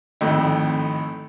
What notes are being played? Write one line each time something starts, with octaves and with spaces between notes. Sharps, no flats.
G#1 F2 A2